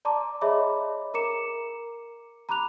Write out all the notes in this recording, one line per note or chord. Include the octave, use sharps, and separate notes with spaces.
D5 A5 A#5 C6 D6
G#4 C#5 D#5 E5 B5 D6
A#4 A#5 D6 C#7 E7
A#5 B5 D6 F#6 F7